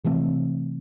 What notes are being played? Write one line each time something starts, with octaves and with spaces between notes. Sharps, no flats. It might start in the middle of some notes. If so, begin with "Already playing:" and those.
C3 E3 A3 C4